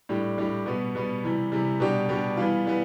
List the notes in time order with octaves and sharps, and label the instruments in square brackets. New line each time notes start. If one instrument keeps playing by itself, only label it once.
[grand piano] A2 G3 D4 G4
A2 G3 D4 G4
B2 G3 B3
B2 G3 B3
C3 E3 G3
C3 E3 G3
B2 G3 D4 G4
B2 G3 D4 G4
E3 G3 B3 F4
E3 G3 B3